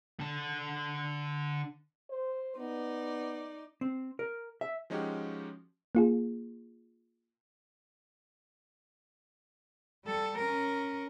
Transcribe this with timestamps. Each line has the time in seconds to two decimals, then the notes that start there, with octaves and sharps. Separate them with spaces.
0.20 D3 A5
2.10 C5
2.58 B3 D#4 D5
3.81 C4
4.19 A#4
4.61 E5
4.90 F3 G#3 C#4 D#4 F#4 G4
5.95 A#3 F4 G#4
10.05 G3 A4
10.39 C#4 A#4